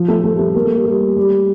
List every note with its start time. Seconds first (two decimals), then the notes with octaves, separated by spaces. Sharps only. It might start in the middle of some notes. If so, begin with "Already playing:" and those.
Already playing: F3
0.08 A3
0.24 A3
0.33 G3
0.39 A3
0.55 A#3
0.65 A3
0.76 G3
0.86 G3
1.17 G3